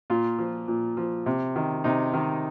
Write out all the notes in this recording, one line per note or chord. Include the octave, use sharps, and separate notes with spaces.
A#2 F4
F3
A#2
F3
C3
D#3
C3 D#4
D#3